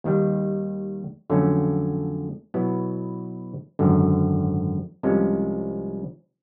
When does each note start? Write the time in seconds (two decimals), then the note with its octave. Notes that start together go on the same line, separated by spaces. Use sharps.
0.04 D#2 D#3 G3
1.30 F2 D3 F#3 A3 C#4
2.54 B2 F#3 B3 E4
3.79 G#1 F#2 D3
5.03 C2 C3 F3 G#3 C#4